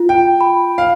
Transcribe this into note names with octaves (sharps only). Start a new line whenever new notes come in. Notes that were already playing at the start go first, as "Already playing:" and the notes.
Already playing: F4
G5
B5
F5